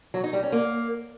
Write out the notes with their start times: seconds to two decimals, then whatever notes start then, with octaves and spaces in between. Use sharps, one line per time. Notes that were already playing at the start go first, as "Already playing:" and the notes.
0.14 F#3
0.24 D#4
0.33 G3
0.43 C#4
0.52 A#3